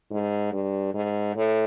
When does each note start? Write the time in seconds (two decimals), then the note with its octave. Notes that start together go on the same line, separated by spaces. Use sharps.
0.11 G#2
0.52 G2
0.94 G#2
1.36 A2